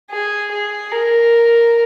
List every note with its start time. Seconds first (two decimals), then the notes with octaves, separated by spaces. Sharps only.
0.11 G#4
0.51 G#4
0.92 A#4